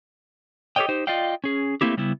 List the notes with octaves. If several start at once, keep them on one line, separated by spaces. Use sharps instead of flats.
G4 A4 A#4 C#5 D#5 G5
D#4 G4 C5
F4 D5 D#5 F5 G5
C#4 G#4
A3 A#3 C4 E4 G4
C#3 G3 B3 E4